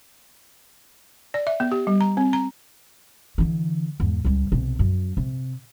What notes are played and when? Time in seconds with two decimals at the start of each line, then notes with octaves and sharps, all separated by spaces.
1.34 D5
1.47 E5
1.60 B3
1.72 G4
1.87 G3
2.01 A#5
2.17 C4
2.33 A#5
3.38 D3 E3
4.00 E2 G#2
4.25 C#2 G3
4.52 B1 C3
4.79 F#2
5.17 C3